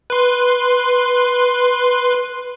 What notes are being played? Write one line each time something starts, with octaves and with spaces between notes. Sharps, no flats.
B4 C6